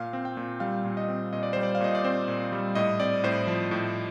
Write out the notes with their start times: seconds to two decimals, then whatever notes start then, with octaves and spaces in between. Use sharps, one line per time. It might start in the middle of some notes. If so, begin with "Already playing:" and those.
Already playing: A#2 F5
0.13 C4
0.25 G5
0.37 A#2
0.60 G3 F5
0.84 A#2
0.97 D#5
1.09 C4
1.33 A#2 D#5
1.43 D5
1.53 G3 C5
1.63 D5
1.75 F5
1.81 A#2 D#5
1.95 D5
2.04 C4 C5
2.28 A#2
2.52 G3
2.75 A2 D#5
3.00 C4 D5
3.24 A2 C5
3.47 F3
3.71 A2